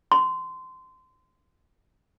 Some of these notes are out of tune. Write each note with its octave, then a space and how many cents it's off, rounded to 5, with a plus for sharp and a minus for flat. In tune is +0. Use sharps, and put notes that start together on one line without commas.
C6 -20